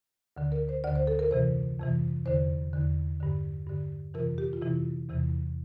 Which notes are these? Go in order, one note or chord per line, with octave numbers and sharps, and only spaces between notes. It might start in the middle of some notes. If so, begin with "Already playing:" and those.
D2 D3
A#4
C5
D2 D3 D5
C5
A4
A#4
F2 C3 E3 C5
F2 C3 E3
E2 D3 C5
E2 D3
G2 D3
G2 D3
F2 C3 E3 A#4
G4
F4
F2 C3 E3 E4
E2 C3 E3